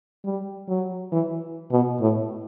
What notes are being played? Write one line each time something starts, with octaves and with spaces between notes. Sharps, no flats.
G3
F#3
E3
B2
A2